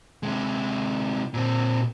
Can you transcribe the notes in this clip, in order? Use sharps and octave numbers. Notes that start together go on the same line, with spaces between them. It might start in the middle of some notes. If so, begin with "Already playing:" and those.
C3 G#3
A#2 C4